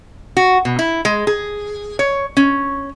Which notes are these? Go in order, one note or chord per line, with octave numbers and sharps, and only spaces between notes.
F#4
B2
E4
G#3
G#4
C#5
C#4